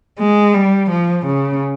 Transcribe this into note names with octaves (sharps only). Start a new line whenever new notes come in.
G#3
G3
F3
C#3